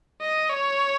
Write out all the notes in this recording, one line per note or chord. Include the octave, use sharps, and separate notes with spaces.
D#5
C#5